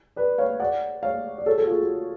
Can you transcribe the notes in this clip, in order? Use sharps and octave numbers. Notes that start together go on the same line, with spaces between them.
B4 D5
C#5 F5
D5 F#5
C#5 F5
D5
A4 C#5
F#4 A4
F4 G#4
F#4